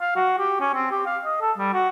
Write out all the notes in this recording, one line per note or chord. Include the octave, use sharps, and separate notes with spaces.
F5
F#4
G4
C#4
C4
G4
F5
D#5
A4
G3
F#4